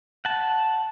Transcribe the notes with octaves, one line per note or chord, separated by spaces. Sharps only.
F#5 A5